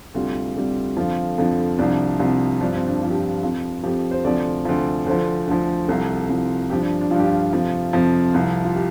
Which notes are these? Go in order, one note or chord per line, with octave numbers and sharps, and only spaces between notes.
D2 C3 G3 F4
D2 C3 G3
F2 D3 F3 F4
F2 D3 F3
C2 C3 F3 D4
C2 C3 F3
G2 F3 D4
C4
D4
G2 F3 F4
G4
F4
F2 F3
F2 F3 G4
C5
D2 C3 F3 D5
D2 C3 F3
D2 D3 F3 C5
D2 D3 F3
C2 C3 F3 A4
C2 C3 F3
G2 F3 G4
D4
D4
G2 F3 F4
G4
F4
F2 C3 F3
F2 C3 F3
C2 C3 F3
F4
G4